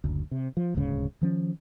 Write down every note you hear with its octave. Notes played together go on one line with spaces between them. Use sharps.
F#1 D2
C3
F3
D#1 D2 G#2 C#3
D#3 F3 C#4